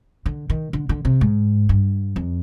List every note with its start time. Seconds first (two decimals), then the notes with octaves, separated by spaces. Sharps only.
0.26 D3
0.50 D#3
0.73 D3
0.89 D3
1.05 C3
1.21 G#2
1.69 G2
2.16 F2